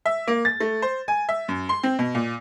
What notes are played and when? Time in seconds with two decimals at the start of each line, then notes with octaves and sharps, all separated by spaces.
0.06 E5
0.27 A#3
0.45 A6
0.61 A3
0.82 C5
1.08 G#5
1.29 E5
1.48 F#2
1.69 C6
1.83 C4
1.99 B2
2.15 A#2